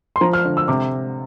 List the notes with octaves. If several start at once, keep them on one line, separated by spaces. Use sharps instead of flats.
C6
F3 A#5
F6
D3
E6
C3 D6